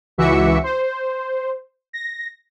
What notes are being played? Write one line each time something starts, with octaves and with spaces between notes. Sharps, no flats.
C#2 E3 F#4 E5 D6 C#7
C5
A#6